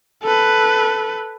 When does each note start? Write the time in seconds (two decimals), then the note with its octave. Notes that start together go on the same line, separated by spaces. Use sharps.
0.23 A4 B4